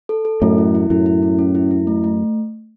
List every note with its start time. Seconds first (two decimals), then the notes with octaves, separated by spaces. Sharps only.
0.09 A4
0.25 A4
0.41 F#2 A2 A3
0.58 E4
0.75 E4
0.90 F#2 A2 E4
1.06 E4
1.22 C#4
1.39 C#4
1.55 E4
1.71 E4
1.87 A3
2.04 A3